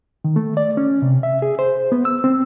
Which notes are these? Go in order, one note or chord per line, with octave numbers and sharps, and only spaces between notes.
D#3
A3
D5
C#4
C3
E5
G#4
C5
B3
E6
C4